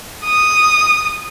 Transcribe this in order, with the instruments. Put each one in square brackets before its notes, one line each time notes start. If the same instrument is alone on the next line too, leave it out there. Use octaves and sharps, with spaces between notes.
[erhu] D#6